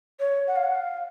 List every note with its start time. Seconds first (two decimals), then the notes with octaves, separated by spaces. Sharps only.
0.20 C#5
0.47 F#5
0.56 F5
0.65 F#5
0.75 F5